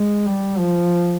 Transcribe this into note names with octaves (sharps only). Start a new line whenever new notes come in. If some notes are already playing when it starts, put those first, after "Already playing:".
Already playing: G#3
G3
F3